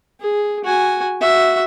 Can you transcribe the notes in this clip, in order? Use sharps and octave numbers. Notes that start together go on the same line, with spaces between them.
G#4
F#4 G#5
F#4 E5